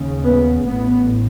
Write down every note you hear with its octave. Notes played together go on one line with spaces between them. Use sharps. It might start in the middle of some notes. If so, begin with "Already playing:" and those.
Already playing: D#2 C#3
B3
A1 A2 B3